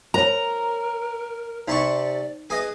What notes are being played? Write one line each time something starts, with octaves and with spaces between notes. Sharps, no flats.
F4 A#4 C5 C#5 A#5
C3 D#4 D5 A5 C#6 D6
G#4 B4 D#5